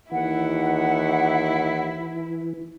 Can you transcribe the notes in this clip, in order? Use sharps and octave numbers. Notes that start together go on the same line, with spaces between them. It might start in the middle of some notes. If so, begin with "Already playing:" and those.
D#2 E3 E4 F#5